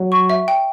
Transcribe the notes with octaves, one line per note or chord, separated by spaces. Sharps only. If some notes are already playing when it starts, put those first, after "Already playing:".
Already playing: F#3
C#6
E5
G5